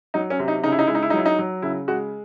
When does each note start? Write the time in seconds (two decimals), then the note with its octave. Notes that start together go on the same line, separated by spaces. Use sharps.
0.14 F#3 D#4
0.30 C#4
0.39 C3
0.48 D#4
0.64 C#3 D#4
0.72 E4
0.79 D#4
0.87 G#3 E4
0.95 D#4
1.03 E4
1.10 D#4
1.14 F#3 E4
1.26 D#4
1.39 F#3
1.62 C#3 E4
1.88 G#3 F#4